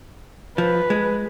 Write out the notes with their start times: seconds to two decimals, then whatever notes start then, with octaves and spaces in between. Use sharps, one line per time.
0.58 F3 B4
0.90 G#3